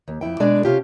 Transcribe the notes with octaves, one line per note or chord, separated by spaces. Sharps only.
D#2
F2 G#2 E4 G5
B2 G#3 D4 G#4 D5
C3 C#4 F4 G4